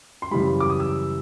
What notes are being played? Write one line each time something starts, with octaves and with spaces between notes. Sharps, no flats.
C6
F#2 C#3 E3 G3 B5
D6
D#6
E6